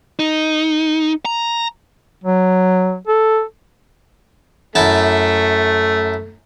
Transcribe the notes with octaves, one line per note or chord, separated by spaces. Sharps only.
D#4
A#5
F#3
A4
F#2 A3 E4 A5